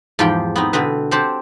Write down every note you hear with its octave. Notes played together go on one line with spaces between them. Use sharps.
E2 G#2 F3 G4 G5
B3 C4 D#4
B2 D3 C4 B4
C4 G4 C5 F#5 A5